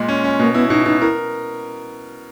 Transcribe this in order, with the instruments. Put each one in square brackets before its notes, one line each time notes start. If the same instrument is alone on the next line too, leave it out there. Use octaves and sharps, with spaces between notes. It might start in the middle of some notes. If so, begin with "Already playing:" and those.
Already playing: [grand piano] A#2 G#3
C#4
C#4
[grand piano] B2 [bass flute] A#3
[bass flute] B3 [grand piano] E4
[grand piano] B2 [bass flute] D#4
[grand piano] B2 [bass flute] D#4
[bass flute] E4 [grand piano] A#4